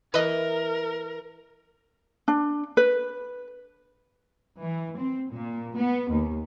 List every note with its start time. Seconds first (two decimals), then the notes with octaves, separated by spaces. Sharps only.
0.14 E3 A#4 B4 D#5
2.28 D4
2.77 B4
4.63 E3
4.99 C4
5.33 A#2
5.78 B3
6.11 D#2